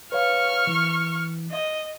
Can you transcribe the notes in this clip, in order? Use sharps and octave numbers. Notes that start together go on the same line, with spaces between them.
B4 C#5 F5 C#6 F6
E3
D#5